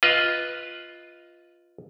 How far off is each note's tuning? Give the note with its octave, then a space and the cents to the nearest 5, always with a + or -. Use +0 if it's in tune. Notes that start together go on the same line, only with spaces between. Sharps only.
F4 +0 B4 +0 D#5 +20